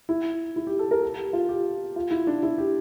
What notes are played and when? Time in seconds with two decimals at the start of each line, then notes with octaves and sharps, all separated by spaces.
0.09 E4
0.56 E4
0.67 G4
0.79 A4
0.91 A#4
1.03 A4
1.18 G4
1.33 F4
1.49 G4
1.96 F4
2.11 E4
2.27 D4
2.43 E4
2.58 G4